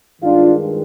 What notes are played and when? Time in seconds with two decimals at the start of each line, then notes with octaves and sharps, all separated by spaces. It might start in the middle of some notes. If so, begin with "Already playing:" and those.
0.21 G2 D#3 G#3 D4 F4